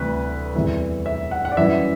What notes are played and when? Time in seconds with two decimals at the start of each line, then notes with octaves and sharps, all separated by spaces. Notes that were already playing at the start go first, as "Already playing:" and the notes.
Already playing: D2 C3 E3 G3 B4
0.54 E2 C3 E3 G3 E5
1.06 E5
1.31 F#5
1.45 F#5
1.52 D5
1.57 F#2 E3 G3 E5